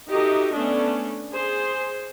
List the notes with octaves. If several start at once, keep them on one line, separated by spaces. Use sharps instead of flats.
D#4 F#4 G4 A4 D#5 E5
A3 B3 C#4 D4
G#4 C5